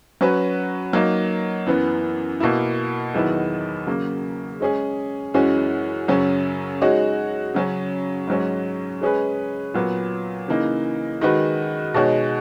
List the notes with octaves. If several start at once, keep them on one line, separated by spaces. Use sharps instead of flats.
F#3 C#4 F#4 B4
F#3 A#3 D#4
F#2 E3 B3
B2 A#3 E4
E2 D#3 F#3 B3 E4
C#3 F#3 A#3
G#3 C#4 G#4
F#2 E3 G#3 C#4 F#4
F#2 C#3 F#3 C#4
G#3 D#4 F#4 C#5
C#3 F#3 C#4
G#2 F#3 C#4
G#3 C#4 G#4 B4
A#2 F#3 B3
C#3 E3 A#3 D#4
D#3 G#3 D#4 F#4 B4
B2 G#3 D#4 F#4 C#5